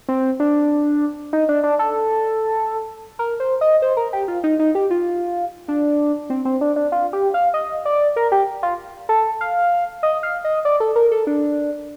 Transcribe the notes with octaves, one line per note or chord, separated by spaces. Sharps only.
C4
D4
D#4
D4
D4
A4
A#4
C5
D#5
C5
A#4
G4
F4
D#4
D#4
G4
F4
D4
C4
C4
D4
D4
F4
G4
F5
D#5
D5
A#4
G4
F4
A4
F5
D#5
F5
D#5
D5
A4
A#4
A4
D4